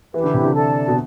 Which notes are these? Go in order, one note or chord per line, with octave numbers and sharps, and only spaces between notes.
E3 E4 G4 B4
D3
C3
D3
A4 D5 A5
B2